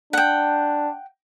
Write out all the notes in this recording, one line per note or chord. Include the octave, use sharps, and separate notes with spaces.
D4 F#5 G5